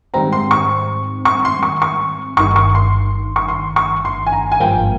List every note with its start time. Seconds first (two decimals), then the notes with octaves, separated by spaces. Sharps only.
0.14 G#2 D#3 G3 C4 A#5
0.33 C6
0.51 C#6
1.25 C#6
1.45 C6
1.63 C#6
1.82 C#6
2.37 G1 G2 D#3 C#6
2.56 C#6
2.75 C6
3.36 C#6
3.48 C6
3.76 C#6
4.05 C6
4.26 G#5
4.32 A#5
4.52 G#5
4.60 G#1 G2 F3 A#3 G5